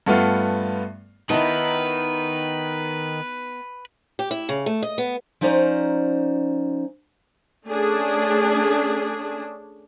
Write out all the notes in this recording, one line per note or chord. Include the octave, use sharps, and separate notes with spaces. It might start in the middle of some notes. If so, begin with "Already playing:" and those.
G2 A3 B3 F4
D#3 B3 D#4 E4 B4 A5
G4
E4
C#3
A3
D#5
B3
F3 C#4 D#4 C5 D5 A#5
A3 C#4 D4 G#4